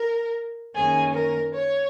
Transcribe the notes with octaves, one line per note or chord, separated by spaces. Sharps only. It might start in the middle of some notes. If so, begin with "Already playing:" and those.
Already playing: A#4
F#2 D#3 A#3 C#4 G#4
A#4
C#5